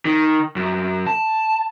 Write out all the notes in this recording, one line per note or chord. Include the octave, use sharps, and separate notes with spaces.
D#3
F#2
A5